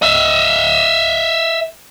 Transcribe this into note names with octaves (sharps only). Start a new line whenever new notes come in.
D#5 E5